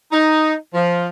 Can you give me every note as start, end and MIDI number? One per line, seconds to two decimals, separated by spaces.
0.12 0.53 63
0.74 1.08 53